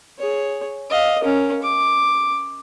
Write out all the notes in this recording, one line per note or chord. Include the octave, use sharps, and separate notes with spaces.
G#4 C#5
D#5 F5
C#4 A#4
D6